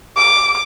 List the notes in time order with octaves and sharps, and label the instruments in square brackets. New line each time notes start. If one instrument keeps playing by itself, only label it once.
[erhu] D6